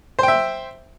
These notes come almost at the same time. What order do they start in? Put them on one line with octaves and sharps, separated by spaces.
C5 G5 E5